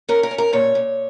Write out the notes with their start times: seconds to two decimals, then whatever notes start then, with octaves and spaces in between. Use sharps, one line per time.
0.09 C#4 A#4
0.23 A#4
0.31 C#4
0.38 A#4
0.53 A#2 C#5
0.75 A#2